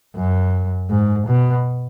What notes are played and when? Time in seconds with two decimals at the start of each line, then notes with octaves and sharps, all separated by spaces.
0.16 F#2
0.90 G#2
1.27 B2